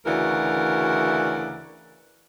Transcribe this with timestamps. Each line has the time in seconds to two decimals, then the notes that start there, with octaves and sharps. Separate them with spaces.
0.06 D2 C#3 E3 F#4 A#4 D5